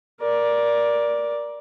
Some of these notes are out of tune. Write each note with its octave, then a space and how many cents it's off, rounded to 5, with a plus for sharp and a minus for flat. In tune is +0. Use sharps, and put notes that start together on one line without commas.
A#4 +20 D5 +0